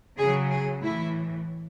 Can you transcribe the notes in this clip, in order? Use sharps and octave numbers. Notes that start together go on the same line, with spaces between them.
C#3 F#3 G#4
G#4
A2 E3 E4